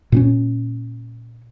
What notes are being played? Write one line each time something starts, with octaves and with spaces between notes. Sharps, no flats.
A#2 C4 C#4